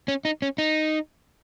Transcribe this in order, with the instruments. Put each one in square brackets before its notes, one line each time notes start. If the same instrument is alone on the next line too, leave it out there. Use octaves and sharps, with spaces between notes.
[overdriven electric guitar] C#4
D#4
C#4
D#4